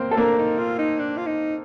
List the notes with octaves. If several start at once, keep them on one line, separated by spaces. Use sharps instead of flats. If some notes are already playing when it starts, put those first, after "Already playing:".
Already playing: A#3 C4 A#4 C5
A4
A#3 D4 A#4
D#4
F4
D#4
D4
F4
D#4